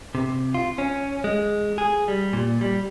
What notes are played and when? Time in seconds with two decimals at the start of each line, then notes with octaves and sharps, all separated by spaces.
0.15 C3
0.55 F4
0.78 C#4
1.24 G#3
1.78 G#4
2.08 G3
2.33 A#2
2.61 G3